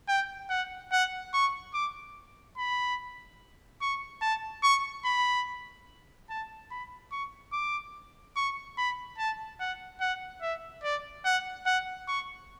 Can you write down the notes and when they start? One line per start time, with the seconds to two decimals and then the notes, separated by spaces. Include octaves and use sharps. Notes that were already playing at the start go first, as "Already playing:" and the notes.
0.09 G5
0.50 F#5
0.92 F#5
1.34 C#6
1.74 D6
2.58 B5
3.82 C#6
4.22 A5
4.63 C#6
5.05 B5
6.30 A5
6.71 B5
7.12 C#6
7.53 D6
8.36 C#6
8.78 B5
9.18 A5
9.60 F#5
10.01 F#5
10.42 E5
10.84 D5
11.25 F#5
11.66 F#5
12.08 C#6